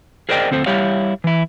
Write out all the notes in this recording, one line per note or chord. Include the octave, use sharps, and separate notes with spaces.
G#4 A#4 C5 D5 D#5 G5
D2 C4 A4 C5
G3 E4 G4 C#5 F5
E3 E4